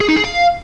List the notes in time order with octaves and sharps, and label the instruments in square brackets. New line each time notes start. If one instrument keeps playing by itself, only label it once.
[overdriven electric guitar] G#4
D#4
G#4
F5